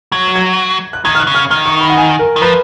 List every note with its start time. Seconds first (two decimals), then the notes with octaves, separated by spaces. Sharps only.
0.12 F#3 G#6
0.36 G#6
0.93 F#6
1.05 D#3 G#6
1.15 F6
1.20 F#6
1.27 C#3
1.35 F6
1.50 D#3 F6
1.66 C#6
1.81 B5
1.90 F#5
1.97 G#5
2.19 A#4
2.36 D#3
2.41 F3 B4